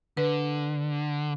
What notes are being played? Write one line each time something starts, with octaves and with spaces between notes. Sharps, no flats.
D3 B4